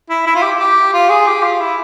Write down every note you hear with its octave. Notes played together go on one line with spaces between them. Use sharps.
E4
E4
F4
G4
G4
F4
G#4
G4
F4
E4